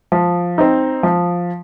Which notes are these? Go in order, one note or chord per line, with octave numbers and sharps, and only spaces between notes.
F3
C4 D#4
F3